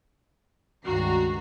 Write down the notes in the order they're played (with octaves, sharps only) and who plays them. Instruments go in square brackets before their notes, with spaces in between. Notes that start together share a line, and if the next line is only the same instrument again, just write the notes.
[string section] C#2 G2 D#3 F#4 A#5 C7